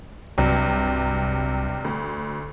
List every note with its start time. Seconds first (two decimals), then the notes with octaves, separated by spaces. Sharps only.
0.38 C2 G2 C3 F#3
1.85 D2